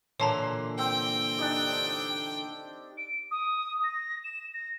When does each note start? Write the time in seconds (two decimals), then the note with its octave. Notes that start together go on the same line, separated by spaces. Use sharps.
0.20 A#2 D3 E3 C#5 A5 A#5 C6 D6
0.79 C4 G5
1.38 D4 D#4 G4
2.98 D7
3.31 D#6
3.84 A#6
4.24 E7
4.53 A#6